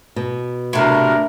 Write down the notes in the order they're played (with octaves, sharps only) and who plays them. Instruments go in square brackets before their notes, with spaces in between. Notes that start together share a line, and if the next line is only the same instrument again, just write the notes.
[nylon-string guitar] B2
[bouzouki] A2 C3 F#3 [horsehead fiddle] D4 A#4 [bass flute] E5